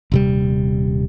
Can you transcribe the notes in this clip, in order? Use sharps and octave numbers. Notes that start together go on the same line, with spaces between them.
D#1 C3 G3